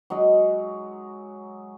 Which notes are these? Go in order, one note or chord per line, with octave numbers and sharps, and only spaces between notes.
F#3 G#3 D#4